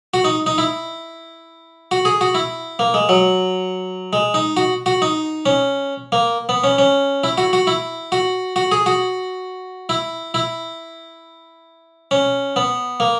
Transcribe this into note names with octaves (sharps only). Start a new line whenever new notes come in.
F#4
D#4
D#4
E4
F#4
G#4
F#4
E4
A#3
G#3
F#3
G#3
D#4
F#4
F#4
D#4
C#4
A#3
B3
C#4
C#4
E4
F#4
F#4
E4
F#4
F#4
G#4
F#4
E4
E4
C#4
B3
A#3